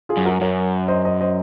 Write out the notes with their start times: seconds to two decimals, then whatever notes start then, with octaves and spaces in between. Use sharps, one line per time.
0.09 F4 G#4
0.17 F#2
0.25 F#4 A#4
0.41 F#2 A#4 C#5
0.88 C5 D#5
1.05 C5 D#5
1.21 C5 D#5